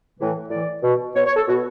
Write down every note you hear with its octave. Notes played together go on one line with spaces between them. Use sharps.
A2 E3
A2 E3 D5
B2
B2 C#5
C#5
A4
B2 F#4